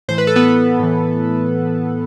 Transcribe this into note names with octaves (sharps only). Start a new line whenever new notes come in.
A2 E3 C5
B4
A4
B3 B4
A2 E3